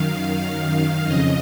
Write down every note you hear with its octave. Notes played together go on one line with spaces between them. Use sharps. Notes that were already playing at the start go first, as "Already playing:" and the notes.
Already playing: F#2 D#3 F5
F2 C#3 D#5